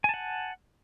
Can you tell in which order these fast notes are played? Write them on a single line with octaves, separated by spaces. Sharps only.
G#5 A5 F#5